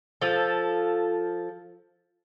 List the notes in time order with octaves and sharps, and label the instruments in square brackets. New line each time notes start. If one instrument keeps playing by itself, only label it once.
[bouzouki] F3 A4